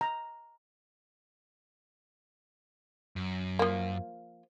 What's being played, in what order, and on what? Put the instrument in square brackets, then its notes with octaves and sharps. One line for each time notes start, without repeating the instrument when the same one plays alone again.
[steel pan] A#5
[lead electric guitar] F#2
[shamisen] F3 A#3